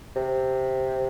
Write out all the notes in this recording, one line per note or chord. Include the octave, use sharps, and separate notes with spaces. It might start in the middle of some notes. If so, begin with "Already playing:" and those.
C3